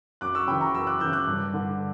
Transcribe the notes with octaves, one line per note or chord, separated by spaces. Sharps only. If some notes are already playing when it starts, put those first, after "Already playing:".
F#2 D6 F#6
C#6 E6
C#3 E3 G5 B5
A#5 C#6
F#2 C#6 E6
D6 F#6
C#3 E3 E6 G6
D6 F#6
G2
D3